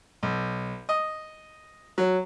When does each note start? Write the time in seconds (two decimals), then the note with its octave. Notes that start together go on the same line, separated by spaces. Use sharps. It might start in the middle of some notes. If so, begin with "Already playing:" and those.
0.23 B1
0.89 D#5
1.98 F#3